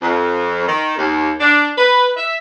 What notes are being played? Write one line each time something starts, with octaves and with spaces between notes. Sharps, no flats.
F2
D#3
D#2
D4
B4
E5